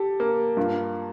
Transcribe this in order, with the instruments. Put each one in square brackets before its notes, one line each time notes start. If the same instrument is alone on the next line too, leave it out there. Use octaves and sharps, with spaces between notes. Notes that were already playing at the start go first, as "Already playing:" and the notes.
Already playing: [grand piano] G4 [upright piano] A4
[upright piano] A#3
[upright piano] G2 [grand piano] F4